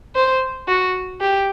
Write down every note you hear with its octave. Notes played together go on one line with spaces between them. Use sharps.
C5
F#4
G4